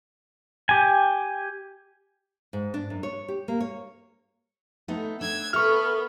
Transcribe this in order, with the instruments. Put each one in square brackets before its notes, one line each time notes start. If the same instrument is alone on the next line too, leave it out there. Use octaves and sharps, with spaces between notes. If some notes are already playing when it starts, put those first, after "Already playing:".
[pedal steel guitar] G4 G#5
[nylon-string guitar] G#2
D4
F#2
C#5
G4
A#3
C#5
[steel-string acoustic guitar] A3 B3 D#4
[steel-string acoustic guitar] D4 [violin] E6 G#6
[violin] B3 [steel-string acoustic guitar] A4 A#4 E5 [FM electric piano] C#6 F6